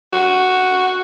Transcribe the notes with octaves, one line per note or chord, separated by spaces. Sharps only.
F#4